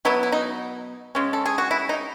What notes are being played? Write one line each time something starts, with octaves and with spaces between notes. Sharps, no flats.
B2 F#3 B3 E4
E4
D#4
C#3 G#3 C#4
A4
G#4
F#4
E4
D#4